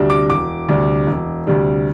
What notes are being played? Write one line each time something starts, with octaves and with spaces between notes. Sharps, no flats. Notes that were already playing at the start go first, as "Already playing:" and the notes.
Already playing: D2 C3 G3 D4
D6
E1 D6
D2 C3 G3 D4
E1
D2 C3 G3 D4